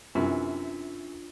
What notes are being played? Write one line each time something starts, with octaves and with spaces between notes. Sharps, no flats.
F#2 C3 E3 D4 F4